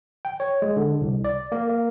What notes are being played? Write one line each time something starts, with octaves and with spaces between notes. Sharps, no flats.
G5
C#5
G#3
D3
C2
D5
A#3
A#3